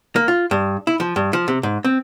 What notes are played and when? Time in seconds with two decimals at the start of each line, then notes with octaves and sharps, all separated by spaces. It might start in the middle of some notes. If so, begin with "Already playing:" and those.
0.16 A#3
0.28 F4
0.51 G2
0.87 E4
1.00 F3
1.16 G2
1.33 F3
1.48 C3
1.63 G#2
1.85 C4